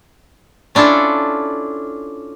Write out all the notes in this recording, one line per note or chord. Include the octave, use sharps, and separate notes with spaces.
C#4 D4 E4 F4 A4